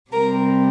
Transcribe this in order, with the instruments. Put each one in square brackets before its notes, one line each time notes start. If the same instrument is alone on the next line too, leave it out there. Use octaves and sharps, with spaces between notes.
[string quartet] C3 G3 C4 A#4